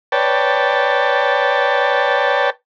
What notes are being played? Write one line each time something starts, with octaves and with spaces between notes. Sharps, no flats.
B4 C#5 D5 G5 A5